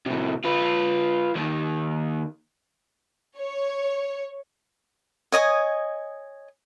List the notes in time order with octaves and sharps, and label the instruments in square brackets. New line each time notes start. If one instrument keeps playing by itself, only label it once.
[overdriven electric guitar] A2 C3
F4 B4
D#2 D#3
[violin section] C#5
[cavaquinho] C#5 D#5 G#5 D#6